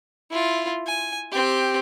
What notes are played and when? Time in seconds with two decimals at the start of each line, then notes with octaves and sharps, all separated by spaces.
0.31 E4 F4
0.86 G#5
1.32 C4 G4